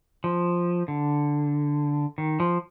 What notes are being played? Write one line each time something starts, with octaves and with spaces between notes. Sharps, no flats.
F3
D3
D#3
F3